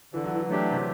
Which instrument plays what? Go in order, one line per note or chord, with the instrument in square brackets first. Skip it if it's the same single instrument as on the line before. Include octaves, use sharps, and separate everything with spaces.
[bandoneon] D3 [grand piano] E3
[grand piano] F#3
E3
[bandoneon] F#3 A3 D4 G4
[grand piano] C3